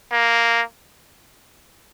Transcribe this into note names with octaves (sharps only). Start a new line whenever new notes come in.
A#3